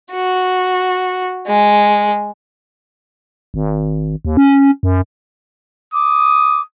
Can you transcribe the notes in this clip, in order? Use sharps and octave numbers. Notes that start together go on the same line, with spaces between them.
F#4
G#3
G#1
D#2
C#4
F#2
D6 D#6